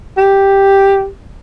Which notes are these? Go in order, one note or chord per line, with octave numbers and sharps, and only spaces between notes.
G4